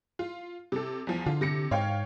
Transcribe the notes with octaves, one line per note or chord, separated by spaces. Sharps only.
F4
C3 A4
E2 F3
D3 F4
C3 A#6 C#7
G#2 C#5 F5 G5